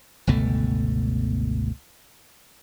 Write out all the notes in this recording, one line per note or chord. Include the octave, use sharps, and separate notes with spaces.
G1 C#2 B2 A3